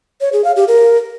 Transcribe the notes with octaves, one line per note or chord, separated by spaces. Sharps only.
C#5
G#4
F5
G4
A#4